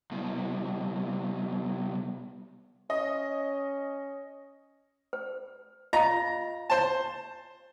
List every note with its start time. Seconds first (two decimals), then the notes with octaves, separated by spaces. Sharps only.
0.11 C2 B2
2.90 C#4 D#5
5.13 C5
5.93 F4 D#5 F5 A#5
6.70 C5 A5